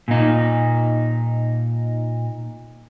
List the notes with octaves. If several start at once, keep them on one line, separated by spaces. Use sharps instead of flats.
A#2 D#4